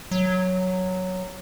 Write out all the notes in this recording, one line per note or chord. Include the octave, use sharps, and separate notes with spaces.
F#3